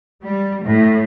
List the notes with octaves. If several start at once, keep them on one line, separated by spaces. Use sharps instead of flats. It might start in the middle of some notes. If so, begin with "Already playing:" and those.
G3
A2